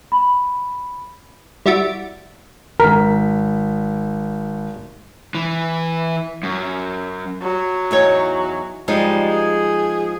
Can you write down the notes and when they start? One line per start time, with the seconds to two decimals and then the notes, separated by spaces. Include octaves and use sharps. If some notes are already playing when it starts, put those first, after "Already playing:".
0.12 B5
1.66 G3 E4 F#4 E5 A6 D7
2.80 G#1 A#4 B6
5.35 E3
6.43 F#2
7.42 F#3
7.91 E2 D#4 C#5
8.88 F3 G3 G#3 D#4
9.28 G#4